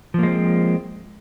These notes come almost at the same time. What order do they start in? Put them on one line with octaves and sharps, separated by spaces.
F3 A#3 G#3 C4